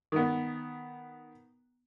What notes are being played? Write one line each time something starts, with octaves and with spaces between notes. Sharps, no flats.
D#3 B3